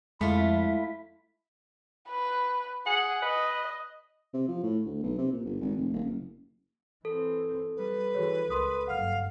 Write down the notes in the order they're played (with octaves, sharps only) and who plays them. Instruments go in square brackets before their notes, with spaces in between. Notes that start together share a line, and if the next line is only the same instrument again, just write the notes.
[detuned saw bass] F2 [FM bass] G#3 [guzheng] A3 F4 [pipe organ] E4 E5
[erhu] B4
[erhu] G#4 [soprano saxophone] F#5
[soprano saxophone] B4 [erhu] D#5
[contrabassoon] C3
F3
A2
D2
B1
C3
A#2
G1
G#1
F1
D#1
F#1
[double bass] E3 C4 [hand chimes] A4
[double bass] G3 [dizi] B4
[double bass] E3 [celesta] F#4 G#4 C#5
[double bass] C#2 [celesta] A#4 C6 D#6
[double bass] F#1 G2 [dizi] F5 [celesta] F#5 F6